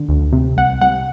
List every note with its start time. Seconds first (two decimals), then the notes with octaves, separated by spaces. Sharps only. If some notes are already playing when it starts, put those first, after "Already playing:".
Already playing: D3
0.09 D2
0.33 C3
0.57 C2 F#5
0.81 C2 F#5